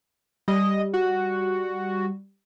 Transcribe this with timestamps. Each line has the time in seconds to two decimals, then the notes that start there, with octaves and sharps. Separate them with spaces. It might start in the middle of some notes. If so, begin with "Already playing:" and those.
0.48 G3 D#5
0.93 F#4